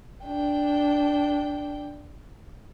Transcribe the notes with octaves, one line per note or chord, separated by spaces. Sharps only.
D4 G5